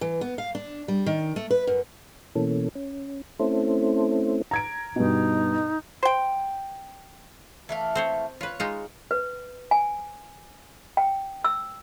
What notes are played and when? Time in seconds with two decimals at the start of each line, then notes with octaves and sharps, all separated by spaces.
0.01 E3
0.21 B3
0.38 F5
0.55 D4
0.88 G3
1.06 D#3
1.36 A3
1.50 B4
1.67 F#2
2.36 B2 E3 A#3 C#4 A4
2.75 C#4
3.39 A3 C4 C#4 E4 A4 C5
4.51 A#5 G#6 D7
4.96 G2 B2 D#4
6.03 C5 G5
7.69 E3 A3 F5
7.95 C4 C5 C#5
8.41 F4 B4 C#5
8.60 G#3 D#4 F4
9.11 B4
9.71 G#5
10.97 G5
11.44 E6